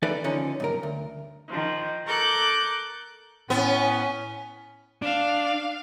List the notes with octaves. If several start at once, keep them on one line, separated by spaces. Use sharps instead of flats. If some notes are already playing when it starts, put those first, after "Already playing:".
E3 D#4 A4 B4 D5
D3 F3 C#4 D#4
B1 G2 A#4
D2
D#3 F3
A4 A#4 C#6 D6 F#6 G6
A2 B3 C#4
D4 F5